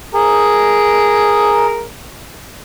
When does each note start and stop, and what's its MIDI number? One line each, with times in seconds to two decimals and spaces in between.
0.14 1.83 68
0.14 1.83 70